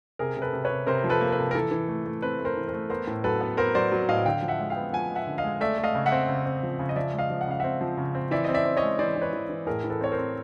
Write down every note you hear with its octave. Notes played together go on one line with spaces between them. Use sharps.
C3 G#4 A#4
C3
A4 B4
C3
B4 C#5
C3
C3 A#4 C5
F3
A4 B4
A#3
A4 B4
C3
A#4
E3 A4
E3
A3
A3
C4 A4 B4
A3
A#4 C5
E3
A#4 C5
A3
B3 A#4 C5
A2
F#3 A4 B4
B3
B3 A#4 C5
F#3 C5 D5
F#3
A2 D#5 F5
D3 F5 G5
F3
E5 F#5
G#3
F5 G5
B3
F3 F#5 G#5
G#3
E5 F#5
D3
D#5 F5
G#3
A3 D5 E5
A3
D#5 F5
C#3
E5 F#5
C4
C#3
C4
F3
C#3
D#5
F3 D5 E5
G#3
D#5 F5
F3
F#5
C#3 F5
C4 E5 F#5
F3
C#3
C4
E3 D5 E5
C4 D#5
D5 E5
C4
C#5 D#5
G#3
E3 C5 D5
E3
B4 C#5
E3
E3
A2 G#4 A#4
E3
A4 B4
C4 C#5
A#4 C5
C4